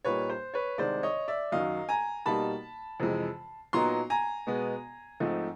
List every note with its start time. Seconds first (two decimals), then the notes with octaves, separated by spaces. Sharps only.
0.05 A#2 G3 A#3 D#4 B4 C#5
0.30 C5
0.54 B4 C#5
0.78 C2 C3 D#3 G#3 C5 D5
1.03 C#5 D#5
1.28 D5 E5
1.52 F#2 D#3 F#3 D#5 F5
1.89 G#5 A#5
2.26 B2 G3 A#3 D#4 A5 B5
3.00 F2 C3 E3 G#3
3.73 A#2 F#3 B3 D#4 A#5 C6
4.10 G#5 A#5
4.47 B2 G#3 B3
5.20 G#2 F3 A3 C4 D#4